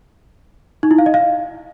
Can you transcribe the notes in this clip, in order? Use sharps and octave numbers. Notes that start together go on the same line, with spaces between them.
D#4
E4
F5
D#5
F5